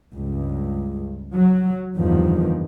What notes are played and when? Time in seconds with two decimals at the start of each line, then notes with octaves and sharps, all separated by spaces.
0.15 C#2 G2
1.34 F#3
1.97 F#1 E2 G2 D#3 F3